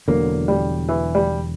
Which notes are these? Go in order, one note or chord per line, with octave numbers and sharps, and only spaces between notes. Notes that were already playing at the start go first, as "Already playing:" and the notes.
E1 E2 D3 F#3 A#3
G3
E3
G3